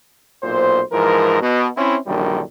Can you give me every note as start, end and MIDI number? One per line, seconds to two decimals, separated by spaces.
0.43 0.82 35
0.43 0.82 46
0.43 0.82 72
0.92 1.41 44
0.92 1.41 52
0.92 1.41 53
0.92 1.41 70
1.41 1.67 47
1.77 1.97 60
1.77 1.97 61
1.77 1.97 64
2.07 2.41 34
2.07 2.41 42
2.07 2.41 50
2.07 2.41 51
2.07 2.41 55